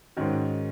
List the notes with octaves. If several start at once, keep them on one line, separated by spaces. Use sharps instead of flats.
G#2 D#3 G#3 C#4 F#4